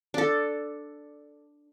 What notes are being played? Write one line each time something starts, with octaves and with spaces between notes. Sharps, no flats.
D4 A4